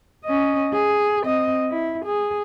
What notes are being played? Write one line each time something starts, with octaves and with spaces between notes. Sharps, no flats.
C#4 D#5
G#4
C4 D#5
E4
G#4